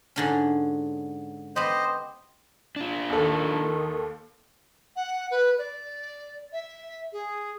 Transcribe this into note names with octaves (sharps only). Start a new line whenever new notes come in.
G#2 D3 C#4
B3 G4 C5 D#5
D4 F4
D#2 D#3 A4
F#5
B4
D5
E5
G#4